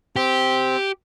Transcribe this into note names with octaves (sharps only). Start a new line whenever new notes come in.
C4 G4